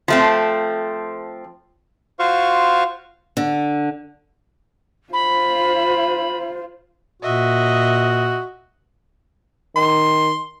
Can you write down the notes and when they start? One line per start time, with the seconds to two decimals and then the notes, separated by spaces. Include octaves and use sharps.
0.08 F3 A3 C4
2.19 F4 F#4 C5 F5 C#6
3.37 D3
5.13 F4 C5 B5
7.22 A#2 F#4 D#5 E5
9.76 D#3 C6